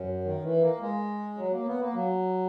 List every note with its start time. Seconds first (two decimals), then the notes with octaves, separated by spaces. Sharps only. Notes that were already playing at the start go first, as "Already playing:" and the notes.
Already playing: F#2
0.24 D#3
0.43 E3
0.61 A#3
0.81 G#3
1.37 F#3
1.52 A#3
1.66 B3
1.80 A#3
1.94 F#3